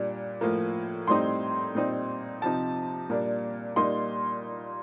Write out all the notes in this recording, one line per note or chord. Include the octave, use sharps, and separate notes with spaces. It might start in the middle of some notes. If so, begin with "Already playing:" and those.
Already playing: A#2 G3 D4
A2 F3 A#3
A2 G3 C4 D#4 C6
A#2 G3 C4 D#4
C3 F3 C4 D#4 A5
A#2 G3 A#3 D4
A#2 G3 A#3 D#4 C6